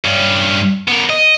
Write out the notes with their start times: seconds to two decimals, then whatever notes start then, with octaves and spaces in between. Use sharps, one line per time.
0.05 G2 C#4
0.88 B3 A#4
1.10 D#5